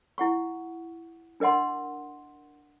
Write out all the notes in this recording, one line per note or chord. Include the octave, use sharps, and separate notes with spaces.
E4 F#5 C#6
D4 A#4 D#5 F#5 C6